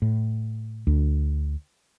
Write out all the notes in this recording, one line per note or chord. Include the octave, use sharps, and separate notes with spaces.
A2
D2